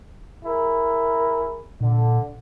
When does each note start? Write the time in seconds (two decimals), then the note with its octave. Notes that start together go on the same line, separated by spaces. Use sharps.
0.44 E4 G#4 A#4
1.80 A#2 D3